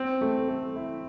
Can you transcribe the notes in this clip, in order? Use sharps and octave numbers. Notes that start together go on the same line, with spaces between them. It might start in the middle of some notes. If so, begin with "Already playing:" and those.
Already playing: C4
A3
A3
E4